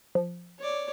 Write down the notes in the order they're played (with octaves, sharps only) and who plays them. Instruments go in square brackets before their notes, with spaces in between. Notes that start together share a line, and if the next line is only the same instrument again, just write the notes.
[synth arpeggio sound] F3
[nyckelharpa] C#5 D5